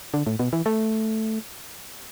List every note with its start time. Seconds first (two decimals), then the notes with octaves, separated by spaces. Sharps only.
0.14 D3
0.27 A2
0.39 B2
0.53 E3
0.66 A3